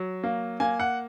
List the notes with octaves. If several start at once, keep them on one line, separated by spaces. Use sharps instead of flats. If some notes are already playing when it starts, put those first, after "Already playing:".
Already playing: F#3
A#3
A#3 G#5
F#5